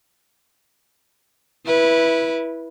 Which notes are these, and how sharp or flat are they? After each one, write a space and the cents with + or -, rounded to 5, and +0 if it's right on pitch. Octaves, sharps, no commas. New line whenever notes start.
E4 +0 B4 -15